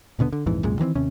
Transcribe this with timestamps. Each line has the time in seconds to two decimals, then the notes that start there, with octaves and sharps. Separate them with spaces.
0.19 D#1 B2 D3 B3
0.32 D3
0.46 A#1 F2 G#2 E3
0.63 C2 F#2 A#2 G#3
0.79 D#3 E3 B3 C4
0.95 D#2 C3 C#4